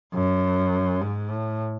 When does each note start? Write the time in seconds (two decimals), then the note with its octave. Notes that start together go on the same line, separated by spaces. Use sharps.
0.14 F#2
1.02 G#2
1.31 A2